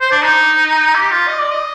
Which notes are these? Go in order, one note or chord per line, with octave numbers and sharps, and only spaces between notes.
C5
D4
D#4
G4
F4
D#5
D5
D#5